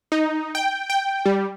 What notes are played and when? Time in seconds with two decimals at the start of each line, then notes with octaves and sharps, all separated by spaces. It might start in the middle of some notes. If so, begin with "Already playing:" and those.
0.12 D#4
0.55 G5
0.90 G5
1.26 G3